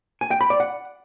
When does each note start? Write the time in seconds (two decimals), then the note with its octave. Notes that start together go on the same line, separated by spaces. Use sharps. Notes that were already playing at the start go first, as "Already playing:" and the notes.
0.21 G#5
0.31 G5
0.41 B5
0.50 D5
0.60 F#5